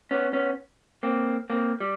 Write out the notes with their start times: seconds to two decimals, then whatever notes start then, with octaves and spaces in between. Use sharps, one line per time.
0.11 B3 C#4
0.33 B3 C#4
1.03 A#3 C4
1.50 A#3 C4
1.80 G3